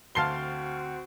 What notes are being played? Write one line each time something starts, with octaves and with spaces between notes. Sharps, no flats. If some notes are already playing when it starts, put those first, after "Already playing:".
D2 C4 F#4 F5 A5 C6 C7 G7